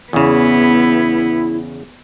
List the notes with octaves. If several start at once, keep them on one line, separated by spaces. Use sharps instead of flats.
E2 C#3 B3 E4